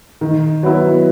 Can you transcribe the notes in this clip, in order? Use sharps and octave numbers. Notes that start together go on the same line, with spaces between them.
D#3
F#3 B3 E4